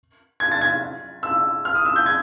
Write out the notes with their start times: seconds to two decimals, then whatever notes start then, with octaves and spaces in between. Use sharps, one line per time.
0.40 G#6
0.51 A6
0.61 G#6
1.23 E6
1.65 F6
1.75 D#6
1.85 E6
1.96 G6
2.06 G#6